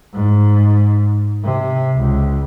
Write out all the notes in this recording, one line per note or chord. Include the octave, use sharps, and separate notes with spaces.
G#2
C3
C#2